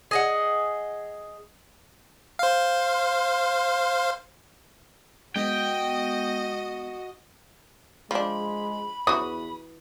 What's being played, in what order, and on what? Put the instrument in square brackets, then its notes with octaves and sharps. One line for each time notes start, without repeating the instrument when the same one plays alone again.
[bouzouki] G#4 D#5 F#5
[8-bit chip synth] C5 F5
[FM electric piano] G#3 B3 [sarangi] F#4 [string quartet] D#5 [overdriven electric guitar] G5
[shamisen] F3 D4 [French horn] G#3 [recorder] B5
[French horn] E2 [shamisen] E3 F#4 [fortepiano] D#6